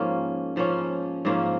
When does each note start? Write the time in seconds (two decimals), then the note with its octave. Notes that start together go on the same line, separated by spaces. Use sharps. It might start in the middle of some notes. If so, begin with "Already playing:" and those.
Already playing: G#2 F3 A#3 C#4
0.56 G#2 F3 A#3 C#4
1.25 G#2 F3 A#3 C#4